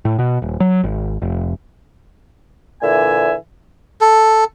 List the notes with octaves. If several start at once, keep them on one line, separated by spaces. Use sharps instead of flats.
A2
B2
D#1
F#3
G#1
F1
A#2 D3 E3 E5 G#5
A4